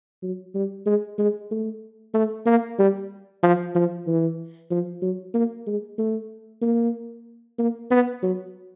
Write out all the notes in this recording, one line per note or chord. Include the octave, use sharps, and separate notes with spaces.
F#3
G3
G#3
G#3
A3
A3
A#3
G3
F3
F3
E3
F3
F#3
A#3
G#3
A3
A#3
A#3
B3
F#3